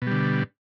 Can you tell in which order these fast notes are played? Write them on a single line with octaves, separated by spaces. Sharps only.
B2 G3 D3